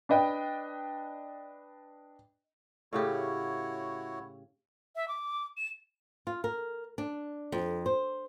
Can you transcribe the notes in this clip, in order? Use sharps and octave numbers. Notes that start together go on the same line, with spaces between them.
D4 B4 D#5 G5
A2 C#3 E4 F#4 G4 C#5
E5
D6
E7
F4
A#4
D4
F2
C5